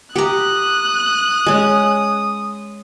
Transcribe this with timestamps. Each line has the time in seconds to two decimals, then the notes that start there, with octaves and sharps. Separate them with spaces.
0.16 G4 A#5 D#6 F#6
1.46 G#3 C#4